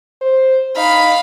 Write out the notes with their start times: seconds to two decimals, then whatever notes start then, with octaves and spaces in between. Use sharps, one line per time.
0.21 C5
0.77 D#4 F5 B5